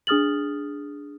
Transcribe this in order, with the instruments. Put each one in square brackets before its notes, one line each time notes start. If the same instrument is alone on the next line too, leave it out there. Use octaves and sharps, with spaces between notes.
[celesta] D4 G#4 D#6 F6 A6 F#7